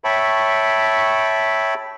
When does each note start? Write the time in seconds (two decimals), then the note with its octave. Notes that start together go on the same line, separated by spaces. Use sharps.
0.04 C#5 E5 G5 A5 B5 C#6